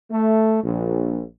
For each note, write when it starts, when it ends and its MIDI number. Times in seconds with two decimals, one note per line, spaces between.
0.11 0.59 57
0.63 1.19 34